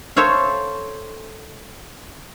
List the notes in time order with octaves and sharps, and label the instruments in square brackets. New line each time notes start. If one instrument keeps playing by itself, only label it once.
[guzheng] A4 C5 C#5 E5 F5